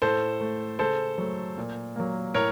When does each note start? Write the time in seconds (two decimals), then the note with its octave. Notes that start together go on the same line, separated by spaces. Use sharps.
0.02 A2 A4 C5
0.41 A3
0.79 C#3 A4 C5
1.18 F#3 A3
1.58 A#2
1.96 F#3 A#3
2.34 A2 A#4 C#5